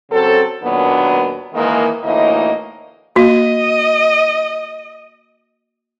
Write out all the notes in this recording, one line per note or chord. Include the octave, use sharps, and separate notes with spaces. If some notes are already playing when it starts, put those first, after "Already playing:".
C#3 F#3 C4 A4
D#2 A#2 F#3 B3 D4
D#3 E3 G#3 A#3
D2 A2 E3 A#3 D#4 D#5
A#3 F#4 D#5